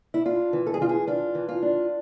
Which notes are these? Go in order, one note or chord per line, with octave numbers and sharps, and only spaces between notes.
E4
D4 F4
E3
A4
G#4
E3 F4
G#4
D4 F4
E3
F4
D4